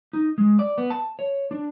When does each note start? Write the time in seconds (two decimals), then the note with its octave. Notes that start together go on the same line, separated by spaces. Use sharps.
0.13 D#4
0.38 G#3
0.59 D5
0.78 B3
0.90 A5
1.19 C#5
1.51 D4